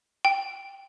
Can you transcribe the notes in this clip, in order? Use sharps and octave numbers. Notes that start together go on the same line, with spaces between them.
G5